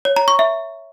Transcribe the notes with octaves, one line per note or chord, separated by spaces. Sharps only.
C#5
A#5
C#6
E5